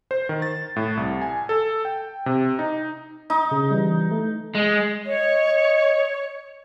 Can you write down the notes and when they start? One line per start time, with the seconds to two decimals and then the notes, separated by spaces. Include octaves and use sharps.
0.11 C5
0.29 D#3
0.42 A6
0.76 A2
0.97 C2
1.22 G#5
1.49 A4
1.85 G5
2.26 C3
2.59 D#4
3.30 D#4 D#6
3.51 C#3
3.71 E3 G3
4.11 A3
4.55 G#3
5.06 C#5 D#5